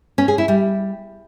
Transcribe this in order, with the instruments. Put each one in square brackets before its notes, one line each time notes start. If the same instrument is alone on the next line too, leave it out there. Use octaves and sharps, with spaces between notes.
[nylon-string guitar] C#4
G#4
E4
G3